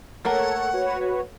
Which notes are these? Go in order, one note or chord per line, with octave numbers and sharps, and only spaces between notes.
A3 A#3 A4 A#4 C#5 F#5
F#4 B4 C#5